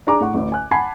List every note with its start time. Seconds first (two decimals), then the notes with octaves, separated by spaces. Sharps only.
0.07 D4 G#4 A#5 D6
0.20 A2 F#5 C#6
0.34 A1 D2 A2
0.52 G#5 F#6
0.71 F#5 G#5 A5 B5 G#6 C7